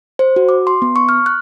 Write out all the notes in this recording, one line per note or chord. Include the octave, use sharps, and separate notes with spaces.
C5
F#4
D6
C6
B3
C#6
F6
F#6